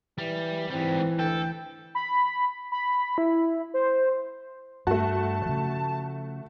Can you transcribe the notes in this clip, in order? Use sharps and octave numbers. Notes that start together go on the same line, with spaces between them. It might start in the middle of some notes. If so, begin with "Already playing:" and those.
E3 G3
G#2 E3 G3 C4
D2 A4 G5
B5
B5
E4
C5
G2 A3 F#4 A5
C#3 F3